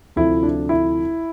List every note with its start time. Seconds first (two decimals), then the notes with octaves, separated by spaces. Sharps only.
0.16 D2 C3 F3 E4
0.43 D4
0.69 E4